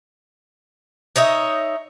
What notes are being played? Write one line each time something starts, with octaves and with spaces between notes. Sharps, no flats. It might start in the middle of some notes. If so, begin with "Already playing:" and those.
D#4 C#5 D#5 E5